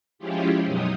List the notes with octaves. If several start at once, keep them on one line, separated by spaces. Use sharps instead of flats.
F3 G#3 C#4 E4 F4 G4
F#2 B2 F#3 D#4 D#5